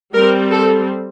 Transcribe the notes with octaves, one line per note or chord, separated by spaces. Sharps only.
G3 C4 A#4
A4